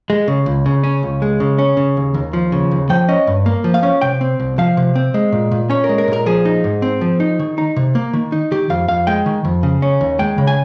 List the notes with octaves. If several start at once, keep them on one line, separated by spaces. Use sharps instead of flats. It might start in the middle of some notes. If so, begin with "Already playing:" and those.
G#3
C#3
C#2
C#3
C#4
C#2
G#3
C#3
C#4
C#3
D#2
D#2
F3
C#3
D#2
F3 G5
C#4 D#5
G2
A#3
F3
F5
C#4
C3 G5
C4
C2
F3 F5
C3
C4
G#3
A#2
A#2
C#4 C#5
A#4
G#3
A#4
A#2
A#4
F3 G#4
D#4
G#2
C4
F3
D#4
D#3
D#4
C3
A#3
D#3
D#4
D#3 G4
F2 F5
F2 F5
G#3 G5
D#3
F2
C#3
C#4
D#2
G#3 G5
C#3
G#5